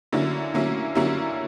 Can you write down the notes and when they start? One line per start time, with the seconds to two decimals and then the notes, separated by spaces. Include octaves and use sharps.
0.12 D3 F#3 A#3 C#4 E4
0.54 D3 F#3 A#3 C#4 E4
0.95 D3 F#3 A#3 C#4 E4